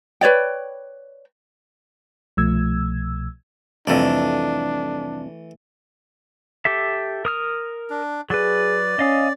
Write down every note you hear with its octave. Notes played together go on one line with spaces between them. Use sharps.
B4 C#5 D5 G5
C2 B2 F3 A3 E6 G#6
C2 F2 E3 A3 D4 D5
G4 A4 E5
A#4 D#6 F6
D4
F#3 G#4 B4 D5
C#4 D#5 F5 D#6